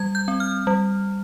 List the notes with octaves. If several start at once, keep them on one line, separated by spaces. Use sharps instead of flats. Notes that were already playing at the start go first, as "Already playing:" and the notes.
Already playing: G3 G#6
G6
C4
F6
G3